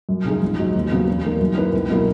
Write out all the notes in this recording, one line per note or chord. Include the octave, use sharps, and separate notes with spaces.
F#2
C#3 G#3 D#4 G#4
A#1
G#2 F#3
D#2
C#3 F#3 B3
E2
D#3 A#3
F#2
D#3 A#3 E4 B4
C#2
B2 F#3 A#3 E4